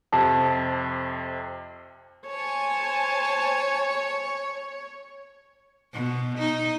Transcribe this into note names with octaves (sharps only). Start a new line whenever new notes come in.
F2 C3 A5
C5 C#5 G#5 A5
B2
D#4